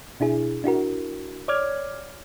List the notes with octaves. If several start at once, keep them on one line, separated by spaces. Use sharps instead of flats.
B2 D4 E4 G#4
D4 E4 F#4 A#4
C#5 D5 D6 F6 G#6